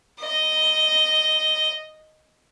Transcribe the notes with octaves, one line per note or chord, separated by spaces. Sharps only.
D#5